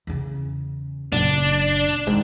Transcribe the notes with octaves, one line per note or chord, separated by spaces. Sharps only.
E2 C#3
F#1 A#2 D4
G#2 D#3